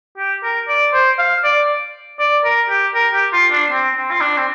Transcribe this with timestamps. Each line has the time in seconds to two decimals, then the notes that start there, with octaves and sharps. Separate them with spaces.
0.18 G4
0.43 A#4
0.68 D5
0.93 C5
1.19 F5
1.44 D5
2.19 D5
2.44 A#4
2.70 G4
2.95 A#4
3.14 G4
3.33 F4
3.52 D4
3.71 C4
3.96 C4
4.11 F4
4.21 D4
4.37 C4